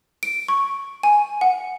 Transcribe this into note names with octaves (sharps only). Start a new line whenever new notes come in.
D7
C#6
G#5
F#5